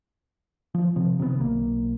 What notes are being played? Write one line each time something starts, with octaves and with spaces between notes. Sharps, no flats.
F3
C3 F3
C3 D#3 A3 B3
B1 A#3